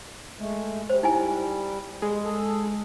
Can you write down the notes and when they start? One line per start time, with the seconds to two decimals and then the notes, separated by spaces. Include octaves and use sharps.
0.39 G#3 A3
0.90 G3 C5
1.03 D#4 E4 G#5
2.02 G#3
2.25 G#4 A4